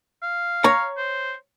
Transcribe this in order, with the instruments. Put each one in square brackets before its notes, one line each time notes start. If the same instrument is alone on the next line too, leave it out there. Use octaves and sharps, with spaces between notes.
[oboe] F5
[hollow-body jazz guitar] C#5 A#5
[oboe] C5